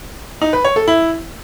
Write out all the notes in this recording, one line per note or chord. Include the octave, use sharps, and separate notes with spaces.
D#4
B4
C#5
A4
E4